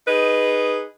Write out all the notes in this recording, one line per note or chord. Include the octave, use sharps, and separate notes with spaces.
D#4 G#4 B4